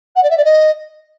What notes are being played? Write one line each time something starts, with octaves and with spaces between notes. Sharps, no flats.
F#5
D5
E5
D5
D#5